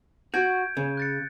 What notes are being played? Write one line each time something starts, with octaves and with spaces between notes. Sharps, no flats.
F#4 G6 G#6 D7
C#3
F#6 A6 C#7